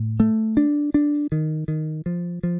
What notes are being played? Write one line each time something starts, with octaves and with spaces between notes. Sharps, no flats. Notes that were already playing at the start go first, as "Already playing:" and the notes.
Already playing: A2
A3
D4
D4
D#3
D#3
F3
F3